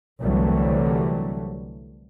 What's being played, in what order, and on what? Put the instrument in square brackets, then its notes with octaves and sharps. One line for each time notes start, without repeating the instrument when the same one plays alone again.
[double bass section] C2 D3 E3 F#3 G3 A3